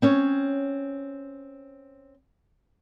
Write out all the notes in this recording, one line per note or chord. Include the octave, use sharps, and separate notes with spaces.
C4 C#4 C#5